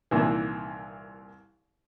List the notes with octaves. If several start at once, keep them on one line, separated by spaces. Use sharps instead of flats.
C2 A#2 D#3 E3